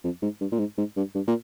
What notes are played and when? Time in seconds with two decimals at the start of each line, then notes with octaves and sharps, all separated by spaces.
0.04 F2
0.22 G#2
0.40 G2
0.52 A#2
0.59 G#2
0.78 G#2
0.97 G2
1.15 G2
1.28 A#2